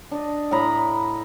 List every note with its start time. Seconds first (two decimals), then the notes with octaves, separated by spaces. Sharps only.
0.11 D4 D#5
0.51 A2 D#5 A#5 B5